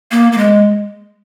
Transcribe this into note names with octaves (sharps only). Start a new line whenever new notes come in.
A#3
A#3
G#3